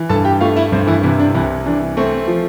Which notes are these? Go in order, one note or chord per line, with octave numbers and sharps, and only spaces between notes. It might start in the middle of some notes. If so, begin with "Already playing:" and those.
Already playing: E3
G2 A4 A5
G4 G5
A3 F4 F5
E4 E5
G2 C4 C5
E3 E4
C3 E3 E4
D4
C2 E3 E4
E3 D4
A3 C4
F3